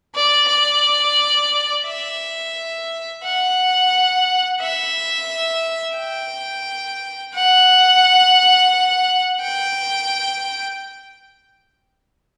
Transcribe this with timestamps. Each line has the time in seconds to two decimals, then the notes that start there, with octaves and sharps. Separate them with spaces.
0.15 D5
0.48 D5
1.86 E5
3.24 F#5
4.61 E5
5.97 G5
7.35 F#5
9.41 G5